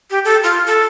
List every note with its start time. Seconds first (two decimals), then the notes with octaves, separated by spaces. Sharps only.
0.11 G4
0.25 A4
0.44 F4
0.67 A4